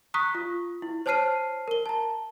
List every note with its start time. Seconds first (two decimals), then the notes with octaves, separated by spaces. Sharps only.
0.14 A#5 C#6 D#6 F#6 B6
0.35 F4
0.82 E4
1.06 C5 C#5 A5 F6 C7 D#7
1.68 A#4 G7
1.86 A5 A#5